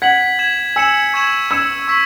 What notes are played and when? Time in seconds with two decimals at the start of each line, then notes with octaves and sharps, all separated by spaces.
0.02 F#5 G#6 B6 F#7
0.39 G#6 E7
0.76 G#5 E6 C#7 E7
1.14 C#6 G#6 E7
1.51 E6 G#6 C#7 E7
1.88 C#6 E6 B6